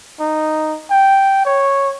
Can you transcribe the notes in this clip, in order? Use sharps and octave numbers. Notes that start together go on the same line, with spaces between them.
D#4
G5
C#5